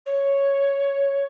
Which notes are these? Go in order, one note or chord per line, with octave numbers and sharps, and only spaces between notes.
C#5